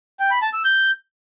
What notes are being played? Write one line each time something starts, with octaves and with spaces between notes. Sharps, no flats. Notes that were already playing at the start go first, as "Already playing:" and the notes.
G5
B5
A5
E6
G6